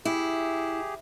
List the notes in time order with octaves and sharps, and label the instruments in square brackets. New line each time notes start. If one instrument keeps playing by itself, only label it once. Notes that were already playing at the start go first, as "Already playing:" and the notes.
[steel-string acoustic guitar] E4 [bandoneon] G4 G#4